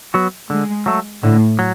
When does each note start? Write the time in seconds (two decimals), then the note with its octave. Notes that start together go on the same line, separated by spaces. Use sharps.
0.14 F#3 B3 F#4
0.50 D3 G#3
0.86 F#3 A3
1.23 A2 D3
1.59 F#3